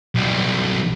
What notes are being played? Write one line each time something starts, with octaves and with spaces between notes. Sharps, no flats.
B1 G3